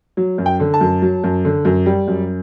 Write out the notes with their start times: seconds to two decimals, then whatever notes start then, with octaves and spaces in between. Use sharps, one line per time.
0.17 F#3
0.38 F#2
0.46 G5
0.60 D3
0.74 A5
0.81 F#2
1.02 F#3
1.24 F#2
1.45 D3
1.65 F#2
1.86 G3
2.07 F#2